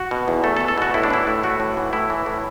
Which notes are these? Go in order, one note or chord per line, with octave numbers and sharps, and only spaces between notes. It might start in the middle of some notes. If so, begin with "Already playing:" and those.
Already playing: F#4
B2
E2
A3 A4
A4
E2
A4
B2 F#4
A2 E4
D4
E3 E4
A2
A3 F#4
A2
E3
A2 E4
E3
A2